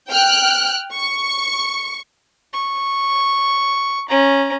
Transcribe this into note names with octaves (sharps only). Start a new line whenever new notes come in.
G5 F6 F#6
C#6
C#6
C#4 A#5